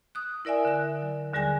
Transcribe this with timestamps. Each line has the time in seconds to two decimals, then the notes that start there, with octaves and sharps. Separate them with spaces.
0.15 D#6 F#6
0.45 E4 A#4 D5 E5 G#5
0.65 D3 F#6
1.02 F#3
1.33 D#2 D3 G3 G#4 G#5 A#6